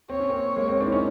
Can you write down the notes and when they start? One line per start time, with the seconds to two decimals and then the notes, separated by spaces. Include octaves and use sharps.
0.09 C4 C#5
0.20 C#4
0.29 A#3 C4
0.56 G#3 A#3
0.68 A#3 C4
0.80 C4 D4
0.86 E4
0.92 C#4 D#4